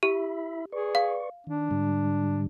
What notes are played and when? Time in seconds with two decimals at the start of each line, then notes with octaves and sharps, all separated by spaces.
0.03 E4 G4 E5 B5
0.72 G#4 B4 D5 C#6
0.95 F5
1.47 D#3 D4
1.71 G#2 D3 G3